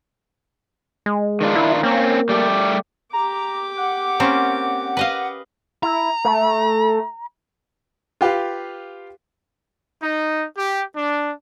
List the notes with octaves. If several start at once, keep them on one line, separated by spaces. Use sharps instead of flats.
G#3
D#3 D4 F4
E4
A#3 C4 C#4
G3 A3 G4
G4 A#5 D6
F#5
A#3 C4 C#4
B4 D#5 F5
E4 A#5
A3
F4 G4 B4 F5
D#4
G4
D4